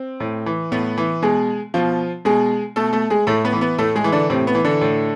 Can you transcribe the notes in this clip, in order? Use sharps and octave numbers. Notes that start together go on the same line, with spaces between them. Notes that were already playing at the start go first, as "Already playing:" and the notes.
Already playing: C4
A2
E3
A2 B3 B4
E3
B2 G#3 G#4
B2 F3 F4
B2 G#3 G#4
B2 A3 A4
A3 A4
G#3 G#4
A2 A3 A4
B3 B4
E3
B3 B4
A2 A3 A4
G#3 G#4
E3
D3 D4
A2 C3 C4
B3
E3
D3 D4
A2